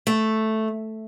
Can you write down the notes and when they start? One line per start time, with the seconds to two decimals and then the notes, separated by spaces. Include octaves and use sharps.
0.07 A3